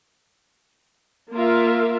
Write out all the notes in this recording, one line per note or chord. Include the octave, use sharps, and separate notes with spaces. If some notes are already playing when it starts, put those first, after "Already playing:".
A#3 F4 A#4 E5 F5